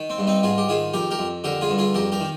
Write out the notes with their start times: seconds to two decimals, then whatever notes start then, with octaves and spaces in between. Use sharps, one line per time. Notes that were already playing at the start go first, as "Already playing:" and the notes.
Already playing: D#3
0.10 C4
0.18 G2
0.27 C4 D#4
0.43 G#2 F4 G#4
0.58 G4
0.69 D#3 F4 G#4
0.93 F2 G4 A#4
1.11 G4 A#4
1.19 F2
1.44 D3 G4 A#4
1.61 F4 G#4
1.70 G2
1.78 F4 G#4
1.94 F2 G4 A#4
2.12 G4 A#4
2.20 D#3